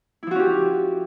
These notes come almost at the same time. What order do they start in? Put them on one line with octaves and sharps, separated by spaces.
E4 F3 F#4 C#4 G4